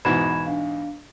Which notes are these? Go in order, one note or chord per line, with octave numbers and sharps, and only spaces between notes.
E2 G#2 B2 B5 G#6 E7
D4 F5